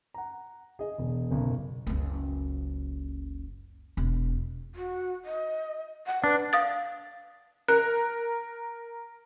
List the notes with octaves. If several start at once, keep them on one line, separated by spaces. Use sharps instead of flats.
F#5 A#5
G#4 D#5
E1
F#1 B1
F#1 C#2
E1
F#4
D#5
F#5
D4 B4
F5 D#6 A6
A#4 F#6